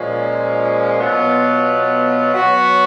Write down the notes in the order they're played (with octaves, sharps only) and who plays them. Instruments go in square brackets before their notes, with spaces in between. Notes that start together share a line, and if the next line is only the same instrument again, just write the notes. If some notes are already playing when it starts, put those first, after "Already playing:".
Already playing: [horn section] A#2 F3 G#3 C#4
B2 F#3 B3 F4
F#3 B3 F#4